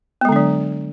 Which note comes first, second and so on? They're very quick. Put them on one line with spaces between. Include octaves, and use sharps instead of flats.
B3 G#3 D3 D4 F#3